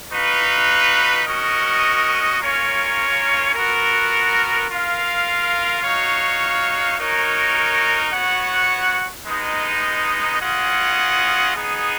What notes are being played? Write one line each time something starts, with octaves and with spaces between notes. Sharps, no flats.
D#4 F#4 B4 F5
C#4 F#4 A#4 D#5
A#3 C#4 F4 A#4 C#5
B3 F#4 A#4
F4 A#4 F5
D#4 F#4 C#5 F5
D#4 F#4 A#4 C#5
B3 F#4 C#5 F#5
G#3 B3 D#4
C#4 F4 G#4 D#5 F#5
B3 D#4 G#4